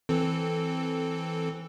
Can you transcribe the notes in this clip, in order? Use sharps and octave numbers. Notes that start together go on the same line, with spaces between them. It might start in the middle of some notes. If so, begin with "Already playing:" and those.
E3 C4 A4